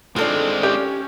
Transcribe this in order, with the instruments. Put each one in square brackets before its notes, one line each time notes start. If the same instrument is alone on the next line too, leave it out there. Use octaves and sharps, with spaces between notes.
[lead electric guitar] G#3 C4 [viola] D4 D#4 [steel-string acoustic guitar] F4 A4 D5
[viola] C#4 [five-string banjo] G4